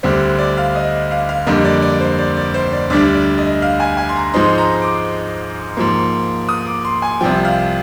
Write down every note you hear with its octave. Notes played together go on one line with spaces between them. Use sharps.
D2 D3 G3 C4
D5
F5
D#5
F5
F5
F2 D3 G3 A#3 D#5
D5
D5
C5
D5
D5
C5
D5
D2 D3 G3 D4 D5
D5
D#5
F5
G#5
G#5
C6
A#5
G#2 F3 G#3 C4 D#4 C6
A#5
D6
G#2 F3 A#3
D#6
D6
C6
G#5
C2 C3 F3 G5
F5